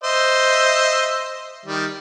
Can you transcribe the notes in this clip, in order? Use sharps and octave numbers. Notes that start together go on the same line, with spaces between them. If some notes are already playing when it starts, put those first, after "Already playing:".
C5 D#5 E5
D#3 G3